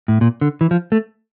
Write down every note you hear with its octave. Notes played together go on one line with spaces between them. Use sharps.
A2
A#2
D3
E3
F3
A3